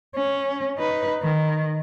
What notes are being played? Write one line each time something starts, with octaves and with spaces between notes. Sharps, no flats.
C#4
D#4 B4
D#3